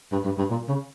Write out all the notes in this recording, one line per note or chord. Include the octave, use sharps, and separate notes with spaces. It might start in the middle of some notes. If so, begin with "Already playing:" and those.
G2
G2
G2
A#2
C#3